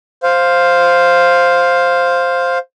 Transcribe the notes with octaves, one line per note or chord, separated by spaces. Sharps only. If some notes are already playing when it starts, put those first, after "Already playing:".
C5 F5